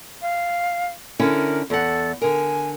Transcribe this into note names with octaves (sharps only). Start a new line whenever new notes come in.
F5
D3 C#4 E4 A#4
E2 A4 F#5
D3 A#4 G#5